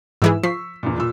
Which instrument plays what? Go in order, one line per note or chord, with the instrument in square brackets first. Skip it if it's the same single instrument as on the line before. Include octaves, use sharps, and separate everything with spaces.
[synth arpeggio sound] G#2 E3 G#4 [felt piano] E6
[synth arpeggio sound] F3 C7 [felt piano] C#6 B6
[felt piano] E2 A#2
A#2 E6